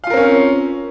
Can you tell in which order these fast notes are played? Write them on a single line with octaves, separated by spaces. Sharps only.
F5 F4 A#4 C4 C#4